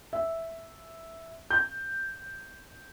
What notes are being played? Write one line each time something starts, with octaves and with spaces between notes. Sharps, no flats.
E5
G6